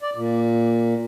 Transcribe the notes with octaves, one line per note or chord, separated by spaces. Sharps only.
D5
A#2